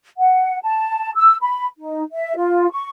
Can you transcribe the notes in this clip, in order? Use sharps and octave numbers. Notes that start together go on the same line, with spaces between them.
F#5
A5
E6
B5
D#4
E5
F4
C#6